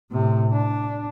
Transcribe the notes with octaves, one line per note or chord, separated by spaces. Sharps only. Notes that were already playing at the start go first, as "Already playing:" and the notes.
A2 C3
D4